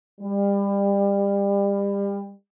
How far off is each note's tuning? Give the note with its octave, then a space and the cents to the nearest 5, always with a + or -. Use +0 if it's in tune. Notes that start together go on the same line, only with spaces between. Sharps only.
G3 +30